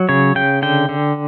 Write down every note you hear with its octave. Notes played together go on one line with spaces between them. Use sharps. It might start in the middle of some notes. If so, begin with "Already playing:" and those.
Already playing: F#3
C#3 C#5
C#3 G5
D3 G5
D3